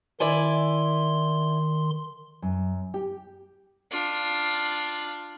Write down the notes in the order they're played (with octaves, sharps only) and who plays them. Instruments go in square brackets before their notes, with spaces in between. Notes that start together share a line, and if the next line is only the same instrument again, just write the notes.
[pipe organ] D#3 C6 [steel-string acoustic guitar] E4 D5 G#5
[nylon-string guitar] F#2
G4
[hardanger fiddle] D4 F4